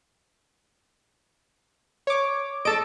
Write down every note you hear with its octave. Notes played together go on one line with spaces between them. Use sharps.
C#5 D6
A4 D#5 A5 D7